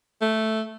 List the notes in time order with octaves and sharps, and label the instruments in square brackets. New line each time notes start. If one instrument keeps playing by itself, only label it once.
[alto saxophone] A3